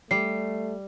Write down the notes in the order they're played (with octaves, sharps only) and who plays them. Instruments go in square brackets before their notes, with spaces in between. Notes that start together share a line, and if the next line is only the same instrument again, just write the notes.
[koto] G3 [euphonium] A3 [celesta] C7